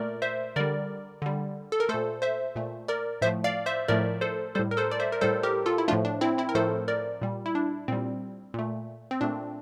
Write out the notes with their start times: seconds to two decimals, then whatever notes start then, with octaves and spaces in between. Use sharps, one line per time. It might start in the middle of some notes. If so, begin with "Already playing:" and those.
Already playing: A#2 A3 A#4 D5
0.22 C5 E5
0.56 D3 G3 A#4 D5
1.22 D3 G3
1.72 A4
1.80 A#4
1.89 A#2 A3 A4 C5
2.22 C5 E5
2.56 A#2 A3
2.88 A#4 D5
3.22 A2 F3 A3 C5 E5
3.44 D5 F5
3.66 C5 E5
3.88 A2 F3 A3 A#4 D5
4.21 A4 C5
4.55 A2 G3 A4 C5
4.71 A#4
4.77 A4 C5
4.91 D5
5.00 C5 E5
5.12 A#4
5.21 A2 G3 A4 C5
5.43 G4 A#4
5.66 F4 A4
5.78 E4
5.88 A2 F3 A3 D4 F4
6.05 D4
6.21 C4 E4
6.38 C4 E4
6.49 A#4
6.55 A2 F3 A3 A4 C5
6.88 A#4 D5
7.22 A#2 G3
7.46 E4
7.55 D4
7.88 A#2 G3 C4
8.54 A#2 A3
9.11 C4
9.21 A#2 A3 D4